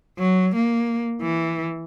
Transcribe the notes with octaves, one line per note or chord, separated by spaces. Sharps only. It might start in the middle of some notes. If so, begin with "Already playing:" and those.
F#3
A#3
E3